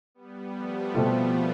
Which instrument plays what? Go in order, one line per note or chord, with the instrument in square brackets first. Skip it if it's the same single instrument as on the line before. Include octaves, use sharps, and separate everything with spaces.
[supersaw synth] G3 B3
F3 A3
[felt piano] B2 A3 C4 F4 A4